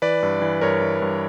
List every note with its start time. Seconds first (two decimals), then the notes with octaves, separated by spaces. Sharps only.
0.02 E3 B4 D5
0.23 G2
0.42 E3
0.61 G2 A#4 C#5
0.82 E3
1.02 G2